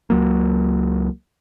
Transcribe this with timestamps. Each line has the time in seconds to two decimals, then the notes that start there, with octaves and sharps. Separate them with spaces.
0.10 C#2 F#3 A#3